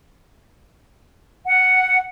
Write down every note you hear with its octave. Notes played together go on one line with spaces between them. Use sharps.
F#5